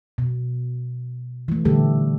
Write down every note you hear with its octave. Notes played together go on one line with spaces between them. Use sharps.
B2
E3 A3
A#2 D3 G3 A3 G4 A4